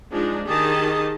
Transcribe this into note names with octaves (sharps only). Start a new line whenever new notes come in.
F3 G#3 D4 D#4
D#3 G4 G#4 D#5 A5